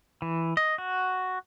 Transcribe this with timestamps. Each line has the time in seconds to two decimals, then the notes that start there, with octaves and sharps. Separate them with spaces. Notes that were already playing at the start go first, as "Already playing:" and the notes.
0.22 E3
0.57 D#5
0.78 F#4